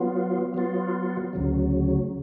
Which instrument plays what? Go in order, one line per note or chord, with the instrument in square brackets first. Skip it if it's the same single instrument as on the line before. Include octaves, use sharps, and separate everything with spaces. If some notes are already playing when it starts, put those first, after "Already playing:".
Already playing: [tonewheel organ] F#3 B3 F4
F#3 B3 F4
D2 C#3 F#3